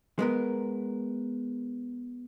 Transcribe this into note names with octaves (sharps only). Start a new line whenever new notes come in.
G#3 B3 A#4